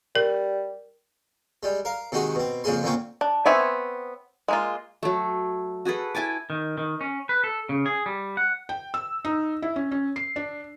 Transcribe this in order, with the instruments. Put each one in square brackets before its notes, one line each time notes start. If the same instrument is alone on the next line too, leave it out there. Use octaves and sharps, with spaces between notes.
[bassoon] G3 [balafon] A#4
[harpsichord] G3 G#3
A#4 F5
C3 D#3 G#3 F#4 G#4
B2 C4
F2 C#3 G#3 A#3 G#4 C6
A#2 D3 A#3 C4 C#4 G5
[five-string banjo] D4
B3 C4 C#5 E5 G#5
G#3 A#3 F4
[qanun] F#3 A3
F#4 G#4 A4 B4
E4 G#5 A5 D6
[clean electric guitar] D#3
D#3
C#4
B4
A4
C#3
G#4
G3
F#5
[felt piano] G5
E6
D#4
E4
C#4
C#4
C7
D4